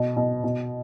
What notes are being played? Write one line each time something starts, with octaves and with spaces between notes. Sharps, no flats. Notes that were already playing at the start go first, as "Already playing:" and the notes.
Already playing: B2
B2
B2